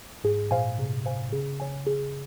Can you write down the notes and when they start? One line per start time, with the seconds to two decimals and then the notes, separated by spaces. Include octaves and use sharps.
0.24 G#2 G#4
0.51 A#2 C5 F5 G#5
0.78 C3 G#4
1.06 C5 F5 G#5
1.33 C#3 G#4
1.60 C#5 G#5
1.87 G#4